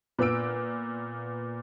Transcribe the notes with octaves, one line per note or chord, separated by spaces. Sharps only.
A#2 B3 F4 E6 D7